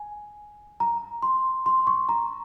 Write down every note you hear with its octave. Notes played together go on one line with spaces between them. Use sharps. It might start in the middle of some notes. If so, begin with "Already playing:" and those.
Already playing: G#5
A#5
C6
C6
C#6
A#5